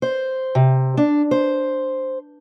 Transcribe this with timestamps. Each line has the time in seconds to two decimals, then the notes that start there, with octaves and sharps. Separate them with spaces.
0.02 C5
0.55 C3
0.97 D4
1.31 C5